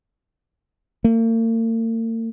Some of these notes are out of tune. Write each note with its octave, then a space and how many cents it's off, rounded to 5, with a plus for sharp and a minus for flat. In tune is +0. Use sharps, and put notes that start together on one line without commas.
A#3 -45